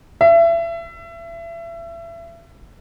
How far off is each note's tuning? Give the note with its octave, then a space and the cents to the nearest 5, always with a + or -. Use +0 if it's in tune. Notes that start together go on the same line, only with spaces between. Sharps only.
E5 +30